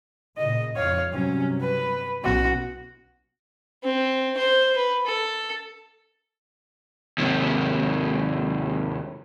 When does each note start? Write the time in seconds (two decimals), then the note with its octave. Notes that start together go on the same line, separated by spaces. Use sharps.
0.37 A#2 C#3 D#5
0.76 F2 C#5 F5
1.13 G2 C3 F#3 C#4
1.61 B4
2.24 B1 B3 C#4 F#4
3.84 C4
4.38 C5
4.77 B4
5.06 A4
7.18 D#2 C3